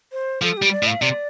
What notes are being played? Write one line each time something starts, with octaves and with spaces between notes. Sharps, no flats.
C5
F3 A4
G4
G3
D5
A2
F5
C3 D5